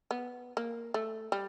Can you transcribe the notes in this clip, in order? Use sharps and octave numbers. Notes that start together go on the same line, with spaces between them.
B3
A#3
A3
G3